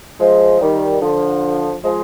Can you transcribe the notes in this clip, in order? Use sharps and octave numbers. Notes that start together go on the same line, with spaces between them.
F3 G#3
D#3 G3
D3 F3
F3 G#3